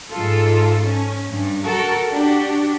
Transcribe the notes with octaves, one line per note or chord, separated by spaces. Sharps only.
G#2 F4 A4
C#4
G2
F#4 A4 A#4
D4 F#4 G4